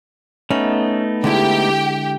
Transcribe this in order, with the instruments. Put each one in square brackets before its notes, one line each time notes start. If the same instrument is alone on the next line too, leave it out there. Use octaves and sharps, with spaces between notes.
[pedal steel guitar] A3 B3 D#4 [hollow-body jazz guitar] C#4
[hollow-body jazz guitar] D3 G#3 E4 [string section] G4 G5